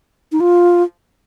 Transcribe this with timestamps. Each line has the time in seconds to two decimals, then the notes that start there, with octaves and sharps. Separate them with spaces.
0.32 D#4
0.40 F4